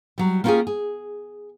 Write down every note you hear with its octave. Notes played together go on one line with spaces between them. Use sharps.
F#3 G3
A#3 B3 C#4 F4 G4 G#4
G#4